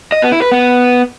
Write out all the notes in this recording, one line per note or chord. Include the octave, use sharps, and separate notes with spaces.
D#5
B3
E4
B4
B3